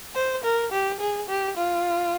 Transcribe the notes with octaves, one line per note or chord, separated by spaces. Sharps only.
C5
A#4
G4
G#4
G4
F4